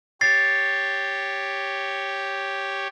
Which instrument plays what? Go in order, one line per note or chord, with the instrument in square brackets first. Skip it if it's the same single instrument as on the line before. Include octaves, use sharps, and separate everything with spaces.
[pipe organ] G4 C#5 [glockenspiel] A6 C7